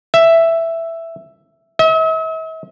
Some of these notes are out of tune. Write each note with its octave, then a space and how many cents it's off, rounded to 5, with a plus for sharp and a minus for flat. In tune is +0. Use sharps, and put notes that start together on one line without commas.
E5 +5
E5 -45